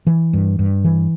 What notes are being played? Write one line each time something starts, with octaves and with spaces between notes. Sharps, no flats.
E3
G2
G2
E3